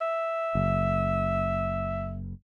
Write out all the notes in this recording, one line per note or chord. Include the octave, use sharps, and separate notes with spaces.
E5
F#1